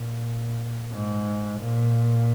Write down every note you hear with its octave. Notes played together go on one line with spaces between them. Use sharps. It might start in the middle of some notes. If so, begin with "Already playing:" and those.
Already playing: A#2
G#2
A#2